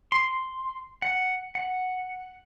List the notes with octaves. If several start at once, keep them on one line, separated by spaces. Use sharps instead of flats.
C6
F#5
F#5